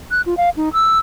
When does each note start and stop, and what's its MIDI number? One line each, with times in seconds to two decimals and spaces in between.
0.11 0.22 90
0.26 0.37 65
0.37 0.49 77
0.57 0.69 63
0.74 0.98 88